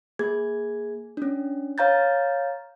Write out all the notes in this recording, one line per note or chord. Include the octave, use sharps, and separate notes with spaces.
A#3 G#4 G#6
C#4 D4
C#5 F5 A#5 G6 A6